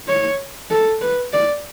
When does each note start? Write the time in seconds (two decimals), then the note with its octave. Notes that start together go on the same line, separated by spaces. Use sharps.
0.08 C#5
0.70 A4
1.01 B4
1.33 D5